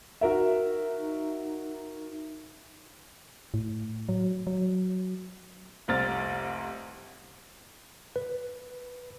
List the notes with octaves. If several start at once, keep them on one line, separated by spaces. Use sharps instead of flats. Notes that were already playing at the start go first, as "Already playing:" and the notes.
D#4 F#4 A#4 E5
A2
F#3
F#3
F1 C2 C4 A#5 F6 A6
B4